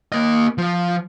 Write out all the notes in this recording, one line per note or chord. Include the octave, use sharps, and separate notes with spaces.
A#3 D#5
F3